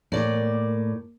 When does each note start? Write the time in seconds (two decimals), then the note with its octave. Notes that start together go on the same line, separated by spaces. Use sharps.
0.12 A2 A#3 A#4 D5